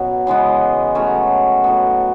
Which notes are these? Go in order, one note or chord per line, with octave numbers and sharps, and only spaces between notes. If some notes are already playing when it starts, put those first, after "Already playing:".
Already playing: B2 F#3 B3 C#4
C#3 E3 G#3 B3
F#3 A3 C#4
A2 F#3 B3